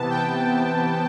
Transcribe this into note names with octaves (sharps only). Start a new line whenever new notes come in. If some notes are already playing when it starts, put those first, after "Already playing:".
Already playing: C3 E3 B3 A5
G5